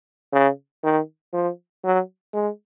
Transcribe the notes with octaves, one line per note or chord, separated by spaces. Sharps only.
C#3
D#3
F3
F#3
G#3